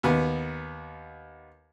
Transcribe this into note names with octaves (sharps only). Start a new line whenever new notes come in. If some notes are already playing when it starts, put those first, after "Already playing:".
D#2 B3